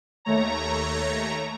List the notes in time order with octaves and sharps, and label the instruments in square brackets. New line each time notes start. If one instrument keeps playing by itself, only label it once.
[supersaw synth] D#2 A3 C#5 A#5